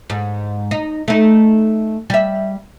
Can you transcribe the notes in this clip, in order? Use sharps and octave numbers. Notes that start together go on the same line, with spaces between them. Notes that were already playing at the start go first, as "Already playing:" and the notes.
G#2
D#4
A3 D#4
G3 E5